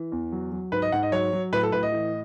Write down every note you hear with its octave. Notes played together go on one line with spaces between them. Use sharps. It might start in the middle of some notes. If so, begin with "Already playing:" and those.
Already playing: E3
E2
F#3
F#3
G#2 B4
D#5
G#2 F#5
D#5
F#3 C#5
F#3
A2 B4
A4
A2 B4
D#5
E3